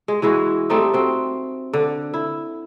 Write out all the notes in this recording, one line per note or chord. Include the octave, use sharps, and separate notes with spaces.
G#3
E3 G#3 E4 F#4
G3 A3 C4 D#4
C4 F#4
D3
E4